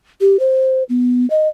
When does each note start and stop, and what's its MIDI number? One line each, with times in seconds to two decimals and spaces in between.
0.21 0.39 67
0.39 0.83 72
0.89 1.28 59
1.30 1.48 75